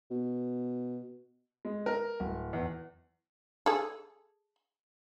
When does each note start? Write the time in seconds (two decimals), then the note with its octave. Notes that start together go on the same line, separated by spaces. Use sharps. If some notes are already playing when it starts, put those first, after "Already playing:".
0.11 B2
1.65 G#3
1.86 A#4
2.20 D1
2.53 E2
3.66 G#4 A4